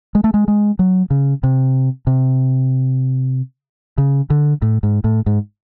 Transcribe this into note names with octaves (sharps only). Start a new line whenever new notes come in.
G#3
A3
G#3
G#3
F#3
C#3
C3
C3
C#3
D3
A2
G#2
A2
G#2